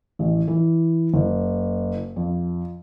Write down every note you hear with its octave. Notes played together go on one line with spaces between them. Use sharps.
A1
E3
F#1
F2